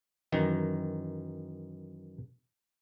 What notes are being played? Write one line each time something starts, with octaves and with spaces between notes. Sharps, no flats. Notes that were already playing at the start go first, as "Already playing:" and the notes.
F#2 D#3 E3